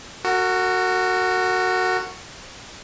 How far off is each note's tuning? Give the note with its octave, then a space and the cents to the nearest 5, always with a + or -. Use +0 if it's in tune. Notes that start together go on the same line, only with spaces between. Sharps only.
F#4 +0 A#4 -40